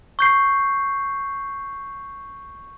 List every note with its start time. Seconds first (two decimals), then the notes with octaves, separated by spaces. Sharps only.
0.19 C#6 G6 C7